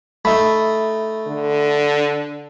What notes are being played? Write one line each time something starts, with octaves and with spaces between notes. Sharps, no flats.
A3 D#4 E5 B5
D3